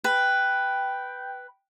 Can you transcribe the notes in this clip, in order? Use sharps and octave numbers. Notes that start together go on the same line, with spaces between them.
B4 G5